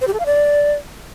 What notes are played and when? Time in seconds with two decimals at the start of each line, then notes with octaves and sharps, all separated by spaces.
0.01 C5
0.07 G4
0.13 A4
0.20 F5
0.26 D5